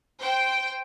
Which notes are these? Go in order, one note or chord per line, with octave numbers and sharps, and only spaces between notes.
C5 G5